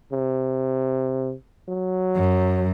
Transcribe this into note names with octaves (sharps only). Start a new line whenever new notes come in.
C3
F#3
F#2